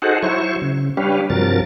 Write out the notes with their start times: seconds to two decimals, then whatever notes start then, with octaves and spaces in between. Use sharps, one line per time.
0.02 D#4 F#4 G#4 A4 C5 F#5
0.23 F#3 E4 C5 C#6
0.61 C#3
0.97 G3 D4 G4 B4 C#5 F5
1.30 G2 C3 F3 F#3 A#4 A6